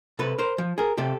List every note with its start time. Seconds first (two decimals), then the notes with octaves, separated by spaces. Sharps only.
0.19 C3 A4 B4
0.38 A#4 C5
0.58 F3
0.78 G#4 A#4
0.97 C3 G4 A4